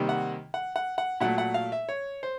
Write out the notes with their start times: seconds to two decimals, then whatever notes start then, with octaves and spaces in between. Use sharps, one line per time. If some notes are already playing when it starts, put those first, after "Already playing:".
Already playing: C3 D#3 G3 A#3
0.09 F#5
0.54 F#5
0.76 F#5
0.98 F#5
1.21 A#2 F#3 A3 F#5
1.38 F#5
1.54 F5
1.72 E5
1.89 C#5
2.23 C5